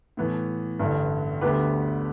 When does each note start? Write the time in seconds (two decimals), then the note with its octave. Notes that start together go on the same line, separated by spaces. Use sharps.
0.17 A2 E3 B3
0.79 A1 G2 D3
1.41 D2 D3 B3 G4 B4